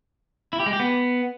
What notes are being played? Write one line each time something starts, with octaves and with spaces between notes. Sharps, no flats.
E4
G4
G#3
G4
B3